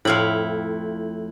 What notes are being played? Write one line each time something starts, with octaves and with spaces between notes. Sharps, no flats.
F2 A2 E4 F5 B5